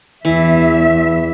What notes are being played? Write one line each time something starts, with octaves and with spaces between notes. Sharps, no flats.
E2 E3 E5